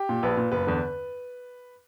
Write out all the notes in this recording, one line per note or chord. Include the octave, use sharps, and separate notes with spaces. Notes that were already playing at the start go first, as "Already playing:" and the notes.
Already playing: G4
A#2
A#1 B4
A#2
F#1 B4
E2 D3